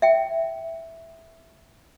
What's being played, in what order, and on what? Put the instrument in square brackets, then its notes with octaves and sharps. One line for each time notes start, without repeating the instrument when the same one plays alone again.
[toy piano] E5 G5